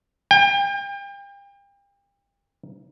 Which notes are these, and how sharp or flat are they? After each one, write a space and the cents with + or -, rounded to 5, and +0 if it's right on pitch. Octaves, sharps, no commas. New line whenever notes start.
G5 +35